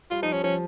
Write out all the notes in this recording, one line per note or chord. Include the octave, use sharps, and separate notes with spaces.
G3 F4
F3 D#4
C#4
F3 C#4